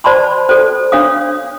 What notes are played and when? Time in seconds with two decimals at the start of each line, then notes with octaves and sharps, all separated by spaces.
0.04 C5 D5 A5 B5 C6
0.49 A4 C5
0.92 D4 C#5 F5 D#6